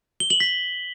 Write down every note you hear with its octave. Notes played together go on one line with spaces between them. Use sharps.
G7
F#7
B6